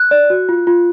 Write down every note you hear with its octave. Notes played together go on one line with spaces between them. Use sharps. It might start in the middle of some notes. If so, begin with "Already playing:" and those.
Already playing: F#6
D5
F#4
F4
F4